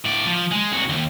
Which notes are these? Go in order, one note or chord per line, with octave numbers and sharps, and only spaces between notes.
A2 D5
F3
G#3
C2 F#4
D#2